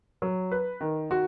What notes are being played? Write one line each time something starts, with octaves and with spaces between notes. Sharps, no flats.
F#3
B4
D#3
F#4